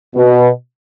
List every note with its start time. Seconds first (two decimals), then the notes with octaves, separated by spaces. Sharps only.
0.15 B2